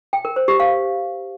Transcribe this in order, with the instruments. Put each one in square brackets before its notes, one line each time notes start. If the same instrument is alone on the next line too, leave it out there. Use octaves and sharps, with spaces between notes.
[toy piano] G5
A#4
C5
G4
F5